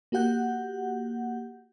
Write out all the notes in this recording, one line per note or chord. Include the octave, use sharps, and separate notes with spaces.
A#3 F#4 G4 F#5 G6